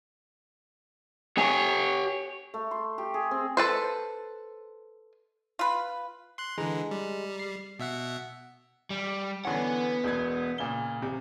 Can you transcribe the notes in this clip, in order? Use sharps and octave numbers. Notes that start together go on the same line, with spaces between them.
G4 C#5 G#5
A3
C6
G4
G#4
C4
A4 B4 C5
F4 B4
C6 F#6
D3 E3 G#3 A#5
G3
C7
B2 E5 F#5
G3
D3 E3 B3 C#4 F#5
E1 B2 G#6
A#2 C#3 G7
A1 C3